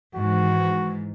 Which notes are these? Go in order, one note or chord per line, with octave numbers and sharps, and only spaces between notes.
G#2 D#3 E3 F#4